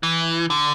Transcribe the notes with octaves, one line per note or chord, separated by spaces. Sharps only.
E3
D3